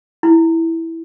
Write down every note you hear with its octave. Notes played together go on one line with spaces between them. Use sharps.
E4